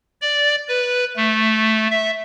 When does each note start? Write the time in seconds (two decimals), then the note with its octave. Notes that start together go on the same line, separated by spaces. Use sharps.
0.21 D5
0.68 B4
1.16 A3
1.91 E5